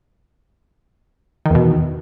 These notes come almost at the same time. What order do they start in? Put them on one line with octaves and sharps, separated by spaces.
D#3 E2 B2